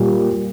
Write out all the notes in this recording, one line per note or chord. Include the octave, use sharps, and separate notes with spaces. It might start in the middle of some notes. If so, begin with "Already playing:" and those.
Already playing: A#2 G3